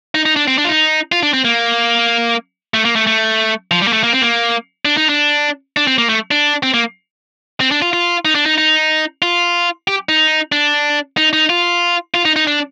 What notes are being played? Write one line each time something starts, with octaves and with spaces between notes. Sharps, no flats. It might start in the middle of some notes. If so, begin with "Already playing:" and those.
D#4
D#4
D4
C4
D4
F4
D#4
F4
D4
C4
A#3
A3
A#3
A3
A3
F3
G3
A#3
A3
A#3
C4
A#3
D4
D#4
D4
D4
C4
A#3
A3
D4
C4
A#3
C4
D4
F4
F4
D#4
D4
D#4
D#4
F4
G4
D#4
D4
D#4
D#4
F4
F4
D#4
D#4
D4